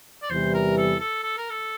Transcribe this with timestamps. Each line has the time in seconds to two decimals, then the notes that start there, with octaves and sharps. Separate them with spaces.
0.22 D5
0.30 E2 C3 E3 G3 C5
0.54 A#4
0.77 A4
1.00 A4
1.24 A4
1.37 A#4
1.50 A4